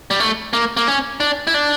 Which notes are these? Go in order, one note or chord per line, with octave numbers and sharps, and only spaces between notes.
G3
A3
A#3
A#3
C#4
D4
E4
D4